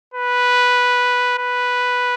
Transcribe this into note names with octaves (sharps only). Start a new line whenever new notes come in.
B4
B4